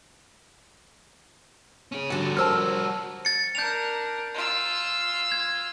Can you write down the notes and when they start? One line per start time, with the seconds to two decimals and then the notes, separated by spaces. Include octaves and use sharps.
1.92 C#4 G#4
2.10 D3 G3 F#4 A4
2.37 A#4 C5 A5 E6 F6
3.25 A6 C#7
3.55 D4 A#4 G6 F7
4.34 F4 E6
5.32 G#6